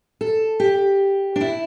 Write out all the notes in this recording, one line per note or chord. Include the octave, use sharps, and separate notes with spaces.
A4
G4
D4
E4